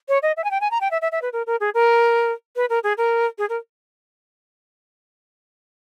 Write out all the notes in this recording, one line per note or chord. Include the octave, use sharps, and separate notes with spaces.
C#5
D#5
E5
G#5
G5
G#5
A#5
G5
E5
E5
E5
B4
A#4
A#4
G#4
A#4
B4
A#4
G#4
A#4
G#4
A#4